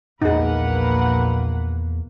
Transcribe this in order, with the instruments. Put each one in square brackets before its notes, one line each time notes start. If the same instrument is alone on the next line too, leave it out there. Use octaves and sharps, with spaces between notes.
[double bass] A#1 A#3 [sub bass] E2 [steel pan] D#4 G#4 [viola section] A#4 B4 F#5